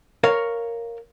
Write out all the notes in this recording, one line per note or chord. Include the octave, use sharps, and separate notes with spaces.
A#4 C#5 F5